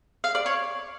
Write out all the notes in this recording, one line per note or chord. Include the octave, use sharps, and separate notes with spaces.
F5
D5
C#5